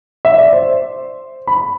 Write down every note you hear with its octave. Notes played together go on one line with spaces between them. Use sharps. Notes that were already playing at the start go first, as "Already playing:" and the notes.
E5
D5
C5
B5